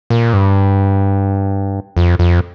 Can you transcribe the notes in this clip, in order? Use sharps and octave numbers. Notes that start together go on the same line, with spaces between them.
A#2
G2
F2
F2